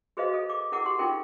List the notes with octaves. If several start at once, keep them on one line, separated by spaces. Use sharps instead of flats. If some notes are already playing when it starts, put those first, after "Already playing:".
F#4 G#4 B4 C5 D#5 F5
A4
D6
E4 G#4 A#4 F#5 D6
G4 C6
D#4 F4 A4 A#4 G5